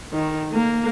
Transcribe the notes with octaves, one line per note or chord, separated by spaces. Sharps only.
D#3
A#3